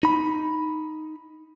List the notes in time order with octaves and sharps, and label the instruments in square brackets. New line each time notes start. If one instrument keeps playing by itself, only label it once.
[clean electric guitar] D#4 B5